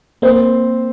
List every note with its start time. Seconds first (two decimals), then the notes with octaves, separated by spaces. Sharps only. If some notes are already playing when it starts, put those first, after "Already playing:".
0.22 A#3 C4 C5